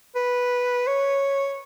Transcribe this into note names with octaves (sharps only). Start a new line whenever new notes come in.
B4
C#5